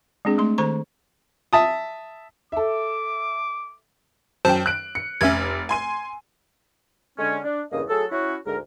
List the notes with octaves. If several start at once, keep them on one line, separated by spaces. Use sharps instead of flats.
G#3 C4 D4 G#4
A3 C6
D#3 C5 A#5 C#6
E5 A5 D#6
A4 E5 D6
F#2 C5 G5 A5
F#6 D7
C#7
F1 C#4 E5 G#6
G#5 C6 D#7
D3 G#3 C#4
D4
E2 G2 C#3 A#3 D#5
F#3 A3 G#4 A4
C#4 E4 F#4
D2 G#2 A#4